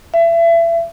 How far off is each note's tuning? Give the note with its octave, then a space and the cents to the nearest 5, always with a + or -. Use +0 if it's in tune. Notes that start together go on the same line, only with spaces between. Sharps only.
E5 +30